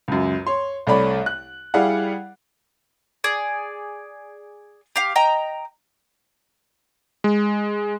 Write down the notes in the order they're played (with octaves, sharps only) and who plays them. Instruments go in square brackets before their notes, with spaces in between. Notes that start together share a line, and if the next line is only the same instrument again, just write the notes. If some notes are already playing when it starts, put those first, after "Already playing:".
[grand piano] C#2 F#2
C#5 C6
C2 A3 C#5 D5 B5
F#6
G3 E4 G#4 D5 F5 F#5
[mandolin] G#4 D5
G4 F5
D#5 G5 A#5
[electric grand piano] G#3